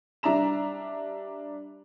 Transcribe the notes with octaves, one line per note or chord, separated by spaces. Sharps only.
G3 D4 E5 A#5 E7